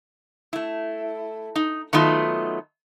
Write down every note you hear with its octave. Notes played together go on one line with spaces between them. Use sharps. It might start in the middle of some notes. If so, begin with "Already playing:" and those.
A3 E4
D#4
D#3 F#3 A3 B3 D#4 F4